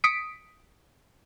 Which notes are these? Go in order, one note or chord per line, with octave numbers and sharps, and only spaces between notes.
D#6 B6 C#7 D7